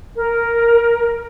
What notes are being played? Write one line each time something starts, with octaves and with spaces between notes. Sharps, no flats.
A#4